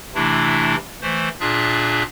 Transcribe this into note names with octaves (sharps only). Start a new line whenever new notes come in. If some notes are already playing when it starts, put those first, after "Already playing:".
C3 E3 A3 D4 E4
E3 A3 C5
A#2 D4 F4 G#4 E5 F#6